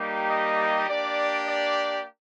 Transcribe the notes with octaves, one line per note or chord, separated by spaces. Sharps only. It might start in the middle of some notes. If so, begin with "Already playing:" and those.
Already playing: G3 A#3 D#4 G4
D#5
A#3 D4 G4 D5
D5